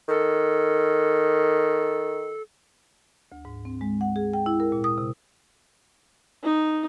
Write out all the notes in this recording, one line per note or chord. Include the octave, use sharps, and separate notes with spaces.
D#3 A4
D2
G#2
C4
G#3
F#5
G#4
G5
E4
A#4
A#2
D#6
C3
D#4